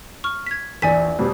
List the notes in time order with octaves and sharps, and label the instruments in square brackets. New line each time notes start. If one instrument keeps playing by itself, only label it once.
[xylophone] C#6 F6
G#6 B6
[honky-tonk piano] A#1 E2 [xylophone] D5 G#5 B6
[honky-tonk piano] F2 B2 G3